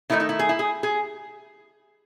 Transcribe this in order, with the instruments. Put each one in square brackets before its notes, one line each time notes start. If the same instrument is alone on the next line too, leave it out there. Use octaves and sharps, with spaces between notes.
[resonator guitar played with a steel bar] D#3 A3 D#4 E4
D#4
E4
G#4
E4
G#4
G#4